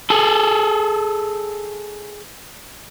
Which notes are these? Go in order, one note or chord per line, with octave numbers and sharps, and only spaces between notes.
G#4 A4